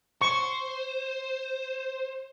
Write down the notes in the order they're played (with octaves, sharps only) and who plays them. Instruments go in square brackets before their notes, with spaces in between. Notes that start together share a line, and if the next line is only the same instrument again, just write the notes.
[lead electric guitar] C5 [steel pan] C#6